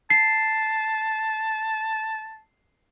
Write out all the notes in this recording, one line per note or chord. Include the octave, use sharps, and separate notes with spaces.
A5 C7